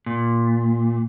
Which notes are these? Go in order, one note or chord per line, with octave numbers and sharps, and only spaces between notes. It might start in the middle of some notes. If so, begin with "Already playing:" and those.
A#2